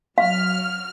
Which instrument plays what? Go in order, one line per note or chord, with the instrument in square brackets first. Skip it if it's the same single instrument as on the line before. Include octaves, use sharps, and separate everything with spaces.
[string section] F#3 F6 [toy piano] F5